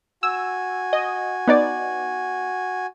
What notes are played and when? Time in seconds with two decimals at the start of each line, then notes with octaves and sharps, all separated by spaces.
0.23 F#4 G#5 E6
0.93 D#5
1.48 B3 D#4 D5